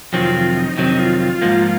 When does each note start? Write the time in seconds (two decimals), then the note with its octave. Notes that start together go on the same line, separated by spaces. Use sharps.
0.13 F2 C3 D#3 F#3 C4 F4
0.35 F4
0.56 D#4
0.77 F2 C3 D#3 F#3 C4 D#4
0.99 F4
1.20 F4
1.42 G#2 F3 A#3